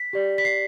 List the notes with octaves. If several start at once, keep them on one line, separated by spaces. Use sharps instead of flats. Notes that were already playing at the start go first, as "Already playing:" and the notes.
Already playing: B6
G4 D5
B6
C7